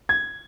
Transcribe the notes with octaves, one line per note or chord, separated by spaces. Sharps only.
G#6